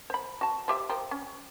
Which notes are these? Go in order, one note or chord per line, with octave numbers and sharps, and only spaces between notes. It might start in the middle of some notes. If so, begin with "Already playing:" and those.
C5 B5
F#4 A5
F3 G4 E5
F3 G4 A#4
C#4